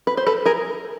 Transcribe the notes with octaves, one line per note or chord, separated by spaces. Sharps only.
B4
C5
A4 B4
G#4 A#4